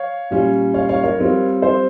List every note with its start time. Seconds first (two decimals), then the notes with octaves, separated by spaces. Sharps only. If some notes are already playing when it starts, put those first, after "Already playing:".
Already playing: C#5 F5
0.31 A#2 G3 C#4 F4
0.74 C#5 F5
0.89 C#5 F5
1.04 A#4 C#5
1.19 G3 C4 F4
1.62 C5 E5